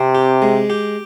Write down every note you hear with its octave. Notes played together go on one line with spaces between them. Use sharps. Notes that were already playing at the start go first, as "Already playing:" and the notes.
Already playing: C3 C4
G4
G#3
G4